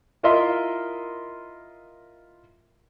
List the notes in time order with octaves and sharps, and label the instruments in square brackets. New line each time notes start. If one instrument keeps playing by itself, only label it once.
[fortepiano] E4 F4 A#4 D#5 E5 C6